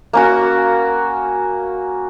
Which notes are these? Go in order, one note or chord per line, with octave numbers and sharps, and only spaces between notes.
A#3 C#4 F#4